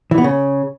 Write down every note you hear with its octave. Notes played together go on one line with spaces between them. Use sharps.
E3
B3
C#3